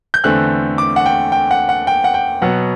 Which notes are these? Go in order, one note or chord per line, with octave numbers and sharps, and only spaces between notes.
G6
E2 D3 A3 C4 F#6
D6
F#5
G5
G5
F#5
F#5
G5
F#5
G5
B2 F#3 B3 F#5